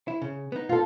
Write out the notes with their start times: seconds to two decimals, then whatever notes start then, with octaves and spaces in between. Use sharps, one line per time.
0.08 E4
0.22 C#3
0.52 B3 D#4
0.69 F4 A4